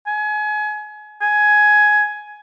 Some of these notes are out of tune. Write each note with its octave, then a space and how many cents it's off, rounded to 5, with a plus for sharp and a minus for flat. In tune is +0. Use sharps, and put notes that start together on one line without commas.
G#5 +30
G#5 +15